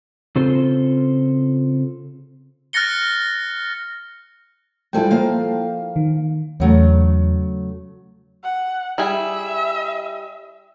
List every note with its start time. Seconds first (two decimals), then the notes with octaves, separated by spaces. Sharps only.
0.36 C#3 C4 F4 A4 C5
2.73 F6 F#6 A6 A#6 C#7 G7
4.93 F3 G3 G#3 E4 A4 G5
5.11 F3 A#3 F5
5.96 D#3
6.60 E2 C#3 F#3 A3
8.44 F#5
8.98 G3 E4 G#4 E5